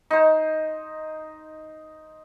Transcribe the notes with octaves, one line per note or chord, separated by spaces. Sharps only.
D#4 C5